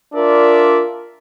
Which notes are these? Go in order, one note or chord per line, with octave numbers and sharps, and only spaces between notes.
D4 F4 A#4 D5 E5